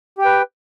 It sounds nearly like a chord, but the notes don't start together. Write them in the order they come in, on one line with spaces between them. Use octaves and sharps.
G4 G5 B4